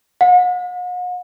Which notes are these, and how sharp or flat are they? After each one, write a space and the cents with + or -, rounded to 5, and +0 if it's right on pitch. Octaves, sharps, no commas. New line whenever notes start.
F#5 -45